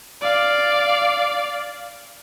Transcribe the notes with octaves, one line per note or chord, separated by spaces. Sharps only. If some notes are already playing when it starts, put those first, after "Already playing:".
D5 F5